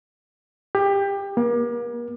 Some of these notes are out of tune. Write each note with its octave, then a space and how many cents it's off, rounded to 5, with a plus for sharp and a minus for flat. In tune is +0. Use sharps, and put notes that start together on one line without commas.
G4 +20
A#3 +40